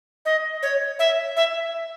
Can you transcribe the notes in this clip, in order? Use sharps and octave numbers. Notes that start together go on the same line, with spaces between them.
D#5
C#5
E5
E5